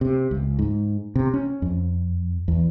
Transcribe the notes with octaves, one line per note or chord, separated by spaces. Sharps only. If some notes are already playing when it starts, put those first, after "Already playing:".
C3
C#2
G#2
C3
C#4
F2
E2